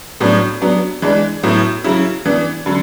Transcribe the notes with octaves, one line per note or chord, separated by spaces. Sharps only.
A2 F#3 B3 D4
F#3 B3 D4
E3 G#3 D4
A2 F#3 B3 E4
C#3 F#3 C#4 E4
E3 B3 D4
D3 F#3 C#4